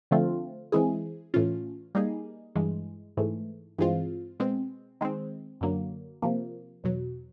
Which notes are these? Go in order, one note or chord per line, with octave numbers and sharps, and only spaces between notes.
D3 F3 A3 C4 F4
E3 G#3 C4 E4 G#4
A2 E3 A3 C#4 F4
G3 A#3 D#4 G#4
G2 E3 G#3
G#2 E3 A3
G2 E3 G#3 C4 F4
B2 G#3 C4
D#3 G#3 C4
F#2 D3 F#3 A#3
C3 F3 A#3
E2 B2 F#3